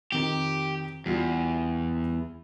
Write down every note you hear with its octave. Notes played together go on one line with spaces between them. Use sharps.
F2 D#3 G4
E2 G3 F4